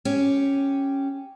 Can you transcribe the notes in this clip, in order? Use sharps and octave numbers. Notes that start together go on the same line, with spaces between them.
C#4 G4